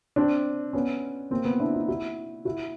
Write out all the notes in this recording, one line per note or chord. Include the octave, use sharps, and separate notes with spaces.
C4 D4
B3 C#4
A#3 C4
B3
D4 E4
D#4 F4
E4 F#4
E4 F#4